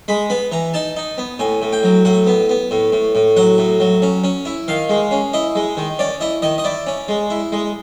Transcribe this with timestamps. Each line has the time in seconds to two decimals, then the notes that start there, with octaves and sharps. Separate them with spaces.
0.08 G#3 B5
0.30 B3 B5
0.52 E3 A#5
0.74 D#4 A5
0.96 D#4
1.18 B3
1.39 A2 G#5
1.62 A2
1.73 G5
1.83 F#3
2.05 A2 F#5
2.27 B3
2.49 B3
2.71 A2
2.92 A2
3.15 A2
3.37 F#3 F#5
3.58 A2
3.80 F#3
4.02 C#4
4.24 C#4
4.45 E4
4.68 D#3 F5
4.89 G#3
5.11 C#4
5.33 E4 D#5
5.55 G#3
5.77 D#3
5.99 C#4 D5
6.21 E4 D#5
6.42 D#3 D#5
6.58 D#5
6.64 E4 D5
6.86 C#4
7.08 G#3
7.30 E4
7.52 G#3